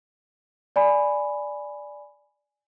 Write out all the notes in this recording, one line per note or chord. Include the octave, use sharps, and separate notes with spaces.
D5 G#5 B5